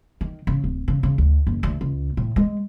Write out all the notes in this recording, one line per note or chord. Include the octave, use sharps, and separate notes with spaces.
D#3
C#3
D1
C#3
C#3
D2
F#1
D2
C#2
A2
G#3